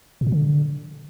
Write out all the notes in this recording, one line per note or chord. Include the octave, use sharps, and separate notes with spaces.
A2
A#2
D3